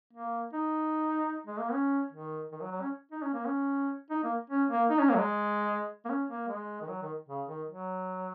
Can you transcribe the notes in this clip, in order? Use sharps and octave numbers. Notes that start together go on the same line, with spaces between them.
A#3
D#4
G#3
A#3
C#4
D#3
D#3
F#3
F#3
C#4
D#4
C#4
A#3
C#4
D#4
A#3
C#4
A#3
D#4
C#4
A#3
F#3
G#3
A#3
C#4
A#3
G#3
D#3
F#3
D#3
C#3
D#3
F#3